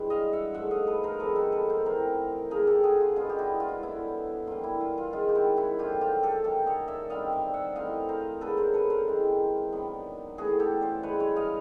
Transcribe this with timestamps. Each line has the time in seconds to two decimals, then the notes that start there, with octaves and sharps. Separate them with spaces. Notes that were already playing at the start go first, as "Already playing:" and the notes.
Already playing: G2 E3 G#3
0.10 D#5 F5
0.33 E5 F#5
0.54 G#2 F3 A3 E5 F#5
0.71 D#5 F5
0.87 A4 B4
1.03 A#4 C5
1.20 C3 F3 G#3 B3 A4 B4
1.36 A4 B4
1.52 A4 B4
1.69 A#4 C5
1.85 E3 A3 C4 D#4 A#4 C5
2.51 C#3 F3 A#3 G#4 A#4
2.67 G4 A4
2.84 F#4 G#4
3.01 F4
3.16 B2 G#3 B3 D4 F4
3.29 G4
3.39 E4 F#4
3.60 F4
3.68 E4
3.83 D3 F#3 B3 D4 E4
4.47 E3 G3 A#3 F4
4.64 E4
4.81 F4
4.98 F4
5.13 D#3 G#3 C#4 E4 F4
5.29 G4
5.35 E4 F#4
5.57 E4 F#4
5.79 F#2 D3 F3 F4 G4
6.01 F4 G4
6.23 G4 A4
6.44 D#3 F#3 A#3 C#4 G4 A4
6.66 C#5 D#5
6.88 D5 E5
7.10 G2 D#3 G3 C4 D#5 F5
7.33 D5 E5
7.54 E5 F#5
7.75 E3 A3 C4 D#4 D#5 F5
8.09 A#4 C5
8.41 C#3 F#3 A#3 D4 A4 B4
8.57 A#4 C5
8.74 A4 B4
8.90 A#4 C5
9.08 E3 G#3 C4
9.72 D#3 F#3 B3 D4
10.38 E3 A3 C#4 F#4 G#4
10.59 G4 A4
10.81 C5 D5
11.03 G2 E3 G#3 B4 C#5
11.20 B4 C#5
11.36 D#5 F5